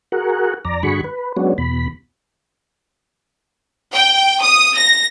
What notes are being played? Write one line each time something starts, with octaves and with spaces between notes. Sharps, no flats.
F#4 G#4 A#4 F#5
F2 D5 A#5
G2 D3 F#4 G#4 B5 C#6
B4
F#3 G#3 B3 C#4 D4 F#4
E2 B2 B5
G5
D#6
A#6